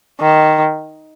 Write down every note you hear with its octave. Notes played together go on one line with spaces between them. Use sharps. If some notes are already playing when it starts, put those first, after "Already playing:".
D#3